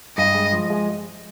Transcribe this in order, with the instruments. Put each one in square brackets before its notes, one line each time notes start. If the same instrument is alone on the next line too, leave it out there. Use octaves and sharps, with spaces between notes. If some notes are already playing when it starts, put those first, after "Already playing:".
[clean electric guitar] G2 [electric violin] D#5
[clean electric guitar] G#3
F3
G#3